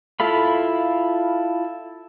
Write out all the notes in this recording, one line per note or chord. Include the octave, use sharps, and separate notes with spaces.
E4 F4 A4 F5 B5